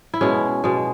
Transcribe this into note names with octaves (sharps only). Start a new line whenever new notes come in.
E4
B2 G#3 C#4
B2 G#3